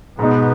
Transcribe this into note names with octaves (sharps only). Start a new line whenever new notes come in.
G#2 B2 G#3 B3 D#4